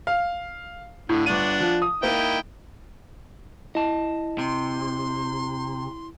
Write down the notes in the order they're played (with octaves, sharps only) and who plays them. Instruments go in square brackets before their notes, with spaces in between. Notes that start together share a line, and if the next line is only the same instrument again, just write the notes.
[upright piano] F5
[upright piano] A2 [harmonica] D3
[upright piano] G1 D#7 [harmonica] D4 F#5
[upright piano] F3
D#6
[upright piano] A#3 [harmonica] D#4 E4 G5
[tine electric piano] E4 [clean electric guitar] D#5 A5
[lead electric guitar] C3 [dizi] C6